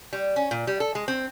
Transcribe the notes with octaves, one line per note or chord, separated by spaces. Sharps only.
G3
C#4
A#2
G3
A4
G#3
C4